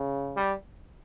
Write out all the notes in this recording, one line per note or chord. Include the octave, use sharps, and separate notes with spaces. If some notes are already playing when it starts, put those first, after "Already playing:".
Already playing: C#3
G3